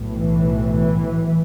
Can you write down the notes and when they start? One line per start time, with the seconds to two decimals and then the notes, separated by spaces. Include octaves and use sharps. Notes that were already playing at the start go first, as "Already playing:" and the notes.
Already playing: B1 A2
0.10 E3
0.70 E3